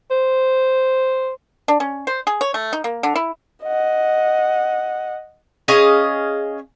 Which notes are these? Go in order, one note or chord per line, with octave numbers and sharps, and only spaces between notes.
C5
D4
C#4
C5
G#4
C#5
A3
D#4
A#3
D3
E4
D#5 F#5
C#4 G#4 D#5 F5